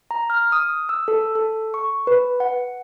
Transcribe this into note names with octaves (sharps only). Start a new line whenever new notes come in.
A#5
F6
D#6
E6
A4
A4
C#6
B4
F#5